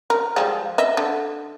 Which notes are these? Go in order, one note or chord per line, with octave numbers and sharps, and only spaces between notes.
A#4
F3 G3 G#3
D#5 E5
D3